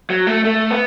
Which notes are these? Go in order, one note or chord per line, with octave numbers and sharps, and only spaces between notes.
F#3
A3
A3
B3